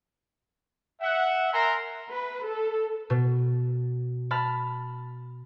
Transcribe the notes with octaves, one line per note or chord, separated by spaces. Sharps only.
E5 F#5
A#4 E5 G#5 A#5 C6
B4
A4
B2
A5 B5 F6